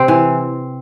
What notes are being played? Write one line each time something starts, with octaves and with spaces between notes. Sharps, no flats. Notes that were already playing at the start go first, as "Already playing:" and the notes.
Already playing: C3 C4 C5
E3